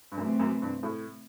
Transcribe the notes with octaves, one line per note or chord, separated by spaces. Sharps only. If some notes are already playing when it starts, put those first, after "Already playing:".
G2
F#2 C3 E3 A3 C4
F#2
G2
A2